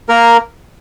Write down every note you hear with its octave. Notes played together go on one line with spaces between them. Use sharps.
A#3 A#4